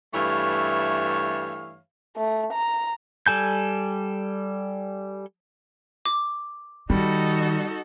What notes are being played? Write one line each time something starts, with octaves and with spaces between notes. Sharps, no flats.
G2 E3 A3 C#5 E5 F5
A3
A#5
G3 A4 G#5 G6
D6
D#3 G3 D#4 F#4 A4